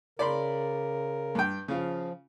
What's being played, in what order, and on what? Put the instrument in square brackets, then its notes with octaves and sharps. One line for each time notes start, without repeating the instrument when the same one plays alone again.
[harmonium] C#3 A#4 [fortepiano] D5 B5 C6
[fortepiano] G2 G5
[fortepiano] C#3 F4 [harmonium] F3